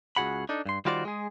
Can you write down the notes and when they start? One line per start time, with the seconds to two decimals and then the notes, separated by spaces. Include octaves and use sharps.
0.16 C#2 D#3 F#4 G#4 F#5 B5
0.49 D4 D#4 A4
0.66 G2 C6
0.85 D#3 G3 F4 F#4 C5 D5
1.05 G#3 G#4